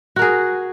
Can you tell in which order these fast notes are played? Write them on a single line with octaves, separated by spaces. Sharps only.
F#4 A#4 G#4